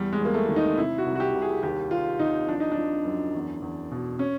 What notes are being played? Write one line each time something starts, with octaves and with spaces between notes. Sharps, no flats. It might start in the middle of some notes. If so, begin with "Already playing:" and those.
Already playing: E2 G3
G#3
E2 A#3
A3
D#3
D#4
C3 E4
F#4
C2
F#4
G4
C2
G#4
D#2 G4
D#2 F4
D#2 D#4
F3 D4
D#4
D4
F3
F#2
E2
E2
B2
C#4